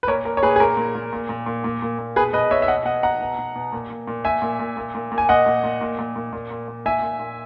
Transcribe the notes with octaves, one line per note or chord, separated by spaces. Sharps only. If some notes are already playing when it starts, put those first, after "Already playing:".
B4
A#2 A#4 C#5
A#2 A#4
C#5
A#2 G#4 B4
G#4
A#2 A#4
A#2
A#2
A#2
A#2
A#2
A#2
A#2
A#2
B2 G#4 B4
B2 B4 D#5
B2 C#5 E5
E5
B2 D#5 F#5
B2 D#5 F#5
B2 F#5 A#5
B2
B2
B2
A#2
A#2
A#2
A#2 E5 G#5
A#2
A#2
A#2
A#2
A#2
G#5
A#2 D#5 F#5
A#2
A#2
A#2
A#2
A#2
A#2
A#2
A#2
A#2 E5 G#5
A#2
A#2